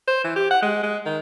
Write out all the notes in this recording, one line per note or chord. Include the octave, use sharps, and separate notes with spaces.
C5
E3
G4
F#5
G#3
G#3
D#3